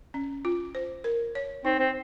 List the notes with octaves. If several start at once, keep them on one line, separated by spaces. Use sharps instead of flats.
C#4
F4
C5
A#4
C#5
C4 D#4
C4